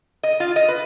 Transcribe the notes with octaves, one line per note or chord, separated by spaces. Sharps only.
D#5
F4
D#5
B4